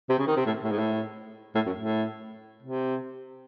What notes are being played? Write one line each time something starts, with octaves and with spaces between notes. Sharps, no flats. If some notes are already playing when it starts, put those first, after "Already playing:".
C3
C#3
D#3
C3
A2
A2
G#2
A2
A2
F#2
A2
C3